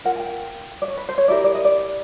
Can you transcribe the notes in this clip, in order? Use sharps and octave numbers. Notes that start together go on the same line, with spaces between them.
F4 A#4 F#5
G#5
G5
D5
C#5
B4
C5
C#5
E4 G4 A#4 D5
D5
D#5
D5